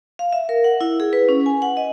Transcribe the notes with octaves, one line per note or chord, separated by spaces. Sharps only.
F5
E5
A#4
F#5
E4
G#4
B4
C#4
G#5
F#5
D#5